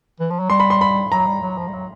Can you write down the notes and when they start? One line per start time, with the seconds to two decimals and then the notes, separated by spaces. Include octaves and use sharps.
0.20 E3
0.30 F3
0.40 F#3
0.50 G3 C6
0.60 B5
0.70 C6
0.81 B5
1.11 F#3 A#5
1.27 G3
1.42 F#3
1.57 F3
1.68 G3
1.73 F#3